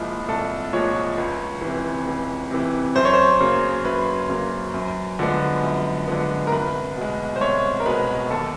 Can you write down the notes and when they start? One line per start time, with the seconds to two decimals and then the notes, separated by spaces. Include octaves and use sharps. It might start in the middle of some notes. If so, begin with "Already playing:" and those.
Already playing: C2 A#2 F3 G#3 E4
0.28 C2 A4
0.73 A#2 F3 G#3 C#5
1.18 C#2
1.62 C3 E3
2.07 C#2
2.51 C3 E3
2.96 F#2 C5
3.05 C#5
3.14 C5
3.40 C#3 F#3 A#3
3.85 F#2 B4
4.29 C#3 F#3 A#3
4.74 F#2
5.19 D3 F3 G#3 B3
5.63 F#2
6.08 D3 F3 G#3 B3
6.47 A#4
6.52 C2 B4
6.96 B2 G#3
7.36 C5
7.41 C2 C#5
7.80 A#4
7.86 B2 G#3 B4
8.30 D#2 A4